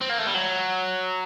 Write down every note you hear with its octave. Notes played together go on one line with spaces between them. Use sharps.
C4
A#3
A3
G3
F#3